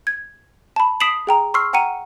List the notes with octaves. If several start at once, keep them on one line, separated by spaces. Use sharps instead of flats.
G#6
A5 B5
D#6 B6 C7 D7 E7 F#7
G#4 G5 A#5
C6 C#6 E6 F6 C7
F#5 G5 A#5 C#7 D#7